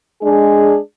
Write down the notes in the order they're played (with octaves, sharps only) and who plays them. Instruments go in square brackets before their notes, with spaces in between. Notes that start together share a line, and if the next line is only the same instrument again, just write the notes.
[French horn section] G#3 D4 G#4